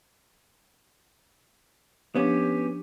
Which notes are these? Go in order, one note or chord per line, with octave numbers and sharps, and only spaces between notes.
F3 B3 C#4 D4 G4